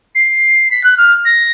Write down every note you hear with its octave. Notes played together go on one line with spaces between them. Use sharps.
C7
B6
F#6
F6
A#6